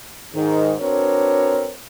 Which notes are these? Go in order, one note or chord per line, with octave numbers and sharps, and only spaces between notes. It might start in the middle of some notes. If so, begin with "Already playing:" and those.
G#2 D#3
C4 D4 F#4 A#4 B4 C#5